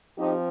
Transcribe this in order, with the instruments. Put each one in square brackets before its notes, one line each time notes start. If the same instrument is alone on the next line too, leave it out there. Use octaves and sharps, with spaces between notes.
[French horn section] F3 C4 D#4 G4